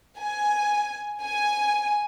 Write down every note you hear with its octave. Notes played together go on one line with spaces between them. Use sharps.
G#5
G#5